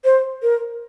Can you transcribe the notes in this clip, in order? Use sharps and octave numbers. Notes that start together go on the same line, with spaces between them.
C5
A#4